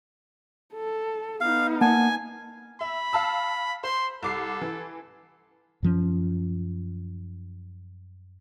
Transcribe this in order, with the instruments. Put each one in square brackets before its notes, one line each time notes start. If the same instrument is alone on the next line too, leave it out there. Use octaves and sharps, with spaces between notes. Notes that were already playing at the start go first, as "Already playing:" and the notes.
[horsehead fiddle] A4
[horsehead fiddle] B3 D#4 [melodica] F5
[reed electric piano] A#3 F#5 A5 [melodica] G#5
[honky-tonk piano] E5 [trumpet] B5
[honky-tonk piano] F5 A5 E6
[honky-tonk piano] C5 [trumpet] C6
[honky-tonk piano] C2 D6 C7 [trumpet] A4
[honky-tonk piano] E3
[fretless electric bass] F#2 F3 C#4